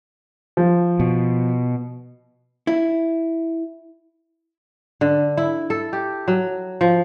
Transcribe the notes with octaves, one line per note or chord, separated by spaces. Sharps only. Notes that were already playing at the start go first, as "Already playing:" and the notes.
F3
B2
E4
D3
E4
A4
G4
F#3
F3